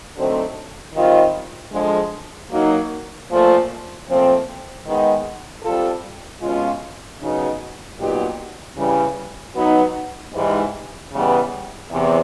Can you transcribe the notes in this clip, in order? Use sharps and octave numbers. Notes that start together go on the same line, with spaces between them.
D3 F#3 A3 C4 D#4
D#3 G3 C4 F4
D3 F3 G#3
F#3 A#3 D#4
A#2 F3 A3
A#2 F3 A3 C4
D#3 G#3 B3 D#4
G3 C4 F4 A4
B2 G#3 C#4 F4
C#3 F#3 B3 D#4
A#2 F#3 B3 D#4 G4
C#3 E3 G3
F#3 B3 D#4
G#2 E3 G3
C#3 E3 G3 B3
E2 C3 E3